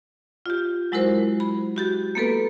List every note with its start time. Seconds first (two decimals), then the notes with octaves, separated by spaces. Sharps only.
0.46 F4 G4
0.92 F#3 G#3 E4 F#4 A#4 C5
1.40 B5
1.77 F#4 G4 A6
2.15 A#3 B3 A4 B4